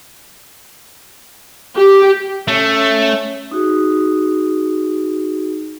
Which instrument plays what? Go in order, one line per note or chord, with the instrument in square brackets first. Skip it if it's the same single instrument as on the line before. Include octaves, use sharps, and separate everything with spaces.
[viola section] G4
[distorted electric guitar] A3 [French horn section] C#4
[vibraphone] D#4 F#4 G#4